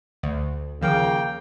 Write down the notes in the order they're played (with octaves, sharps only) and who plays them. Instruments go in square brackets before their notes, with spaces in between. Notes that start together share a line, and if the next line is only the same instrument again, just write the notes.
[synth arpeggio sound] D2
[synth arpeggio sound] D#2 F3 [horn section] C#3 A#3 G5